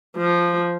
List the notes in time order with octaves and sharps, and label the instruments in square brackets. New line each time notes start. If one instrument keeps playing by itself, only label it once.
[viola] F3